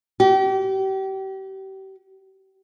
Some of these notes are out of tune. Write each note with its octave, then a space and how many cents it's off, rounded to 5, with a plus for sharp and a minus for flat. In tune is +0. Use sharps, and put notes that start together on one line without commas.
G4 -35